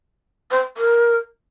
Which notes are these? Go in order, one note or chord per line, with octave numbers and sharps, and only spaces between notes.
C5
A#4